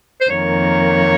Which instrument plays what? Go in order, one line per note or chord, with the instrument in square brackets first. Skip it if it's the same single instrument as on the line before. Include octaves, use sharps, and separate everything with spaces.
[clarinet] C5
[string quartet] F2 D#3 A#3 [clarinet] C#5